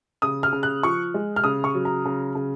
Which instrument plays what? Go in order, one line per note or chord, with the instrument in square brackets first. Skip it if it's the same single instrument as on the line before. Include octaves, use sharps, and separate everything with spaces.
[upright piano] C#3 D#6
F6
C#3
F#6
F3 C#6
G#3
F6
C#3 D#6
C#6
F#3
A#5
C#3
C#3